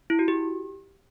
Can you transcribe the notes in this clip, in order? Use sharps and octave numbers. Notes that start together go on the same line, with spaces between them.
E4
F#4
G4